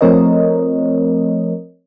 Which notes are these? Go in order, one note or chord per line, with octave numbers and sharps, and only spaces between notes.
F3 A3 C4 A#4 C#5 D#5